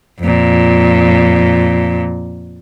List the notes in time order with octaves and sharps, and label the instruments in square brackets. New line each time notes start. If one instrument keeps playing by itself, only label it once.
[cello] F2 A#2